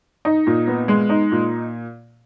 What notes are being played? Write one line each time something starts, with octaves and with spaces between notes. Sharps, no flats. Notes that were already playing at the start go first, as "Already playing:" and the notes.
D#4
A#2
B3
G#3
D#4
A#2